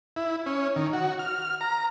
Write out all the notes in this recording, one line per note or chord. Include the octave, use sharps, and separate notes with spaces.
E4
C#4
D#3
F#4
F6
A#5